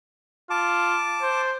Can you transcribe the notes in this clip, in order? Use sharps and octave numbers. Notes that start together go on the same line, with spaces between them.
F4 A5 D6
C5